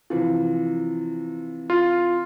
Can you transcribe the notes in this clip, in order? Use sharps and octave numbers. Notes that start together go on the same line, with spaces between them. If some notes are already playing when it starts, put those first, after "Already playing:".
C3 E3 F3
F4